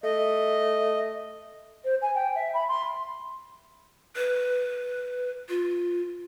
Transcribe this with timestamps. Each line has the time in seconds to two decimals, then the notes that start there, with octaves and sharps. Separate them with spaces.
0.03 A3 D#5
1.85 C5
2.02 G#5
2.15 G5
2.35 E5
2.54 B5
2.68 C6
4.16 B4
5.49 F4